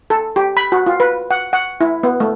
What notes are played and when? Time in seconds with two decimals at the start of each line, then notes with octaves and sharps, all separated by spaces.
0.10 A4
0.36 G4
0.57 B5
0.72 F#4
0.86 F4
1.00 B4
1.31 F#5
1.53 F#5
1.81 E4
2.03 B3
2.20 A3